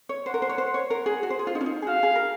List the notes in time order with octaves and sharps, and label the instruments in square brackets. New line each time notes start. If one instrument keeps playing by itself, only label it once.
[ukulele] C#5
[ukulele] C5 [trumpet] F#5
[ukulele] A#4
C5
C#5
C5
C#5
A#4
G#4
F#4
C5
G#4
F4
D#4
C#4
D#4
G#4
[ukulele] F#4 [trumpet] F5
[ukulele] G#4
A#4